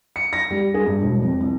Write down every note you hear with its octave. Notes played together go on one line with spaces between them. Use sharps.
C#7
A#6
G3
G#4
G2
E1
F2
C2